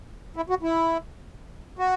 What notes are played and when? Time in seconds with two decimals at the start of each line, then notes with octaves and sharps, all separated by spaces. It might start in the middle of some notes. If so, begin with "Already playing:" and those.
0.36 E4
0.50 F#4
0.63 E4
1.79 F#4